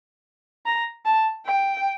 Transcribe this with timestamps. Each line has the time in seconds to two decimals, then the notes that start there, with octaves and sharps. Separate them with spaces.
0.66 A#5
1.06 A5
1.46 G5